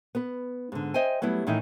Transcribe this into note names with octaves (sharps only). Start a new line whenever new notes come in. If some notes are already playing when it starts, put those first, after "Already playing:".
B3 B4
G#2 D3
C5 D#5 E5 G5 G#5
F#3 G3 A3 B3 E4
A2 D#3 E3 A3 D#4